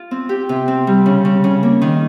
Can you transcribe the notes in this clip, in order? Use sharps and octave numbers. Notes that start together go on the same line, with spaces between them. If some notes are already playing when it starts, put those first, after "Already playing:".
Already playing: F4
C4
G4
C3
C4
G3
C#3
C#3
C#3
A#3
D#3